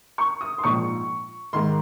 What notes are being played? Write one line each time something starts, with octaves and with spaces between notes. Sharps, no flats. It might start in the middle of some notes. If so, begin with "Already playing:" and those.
C#6
D#6
C6
A#1 G#2 F3 C#6
G#2 D#3 C6